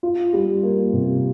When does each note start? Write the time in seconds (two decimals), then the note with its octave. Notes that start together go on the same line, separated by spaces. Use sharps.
0.03 F4
0.33 G3
0.63 A#3
0.93 C3